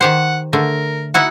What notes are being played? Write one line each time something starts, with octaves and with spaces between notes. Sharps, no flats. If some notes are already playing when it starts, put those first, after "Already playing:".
D#3 G4 C5 F#5
D3 A3 A#4
D#4 E4 F#4 F#5